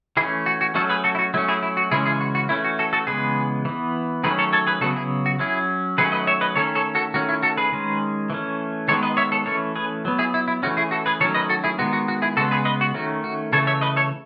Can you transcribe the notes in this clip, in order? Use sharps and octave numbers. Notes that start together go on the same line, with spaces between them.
E3 A3 C#4 E4 G#4
F#4
F#4
F#3 A3 C#4 F#4 A4
G#4 B4
F#4 A4
E4
F#4
F#3 A3 C#4 E4
E4 G#4
E4
F#4
C#3 E3 G#3 C#4 E4 G#4
E4 G#4
F#4
F#4
E3 A3 C#4 E4
F#4
F#4 A4
F#4 A4
C#3 E3 G#3 B3 G#4 B4
E3 B3
D#3 F#3 A3 C#4 G#4 B4
A4 C#5
A4 C#5
G#4 B4
C#3 F#3 B3 F#4 A4
E4 G#4
F#4
F#3 C#4 E4 G#4
D#3 F#3 A3 C#4 G#4 B4
B4 D#5
C#5 E5
B4 D#5
D#3 A3 C#4 A4 C#5
A4 C#5
F#4 A4
D#3 A3 C#4 F#4
E4
F#4 A4
G#4 B4
D#3 G#3 C#4
E3 A3 C#4
D#3 G#3 B3 A4 C#5
B4 D#5
C#5 E5
A4 C#5
E3 A3 C#4 A4 C#5
G#4 B4
F#3 B3
E4 G#4
E4
E4
E3 A3 C#4 F#4
E4 G#4
F#4 A4
G#4 B4
D#3 F#3 A3 C#4 A4 C#5
B4 D#5
F#4 A4
E4 G#4
D#3 G#3 B3 F#4
F#4
F#4
E4 G#4
C#3 G#3 B3 F#4 A4
G#4 B4
B4 D#5
F#4
D#3 A3 C#4 F#4
F#4
C#3 E3 A3 A4 C#5
C#5 E5
B4 D#5
A4 C#5